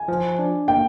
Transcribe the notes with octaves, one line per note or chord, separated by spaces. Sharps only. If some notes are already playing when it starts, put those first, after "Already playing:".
Already playing: G#5
F3
D4
A#3 G5